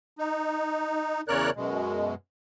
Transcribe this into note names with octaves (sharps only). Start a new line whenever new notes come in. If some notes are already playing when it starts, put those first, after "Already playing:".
D#4
E2 C#3 A#4 C#5 D5 F#6
F#2 B2 G#3